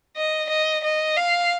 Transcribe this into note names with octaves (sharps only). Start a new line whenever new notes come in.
D#5
D#5
D#5
F5